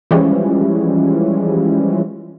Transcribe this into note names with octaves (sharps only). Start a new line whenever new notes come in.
E3 F3 G3 G#3 C#4